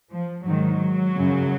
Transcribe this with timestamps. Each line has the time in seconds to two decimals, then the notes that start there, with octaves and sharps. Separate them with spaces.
0.10 F3
0.46 G#2 D#3 F#3
1.16 F#2 C#3